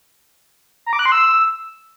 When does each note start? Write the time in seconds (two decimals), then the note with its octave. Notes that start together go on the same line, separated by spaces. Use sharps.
0.86 A#5
0.93 D6
0.99 F#6
1.06 C6
1.12 E6